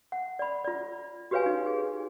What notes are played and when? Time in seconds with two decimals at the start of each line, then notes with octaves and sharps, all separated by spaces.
0.12 F#5
0.39 D5 B5
0.64 F4 D5
1.31 F#4 G4 B4 C#5 F5 G#5
1.46 D#4
1.66 G#4